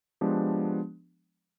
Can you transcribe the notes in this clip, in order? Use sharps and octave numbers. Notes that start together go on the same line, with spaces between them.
F3 G#3 B3 D4 G4